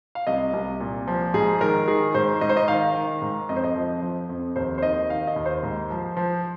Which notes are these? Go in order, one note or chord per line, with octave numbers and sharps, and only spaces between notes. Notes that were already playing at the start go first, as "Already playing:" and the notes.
F5
C2 D#5
C2
A#2
F3
G#2 G#4
D#3 A#4
D#3 G#4
G#2 C5
G#2 D#5
C5
D#5
D#3 F5
D#3
G#2
F2 D#5
C5
D#5
F3
F3
F2
D#2 C5
C5
D#3 D#5
D#3 F5
D#5
D#2
C5
G#2
F3
F3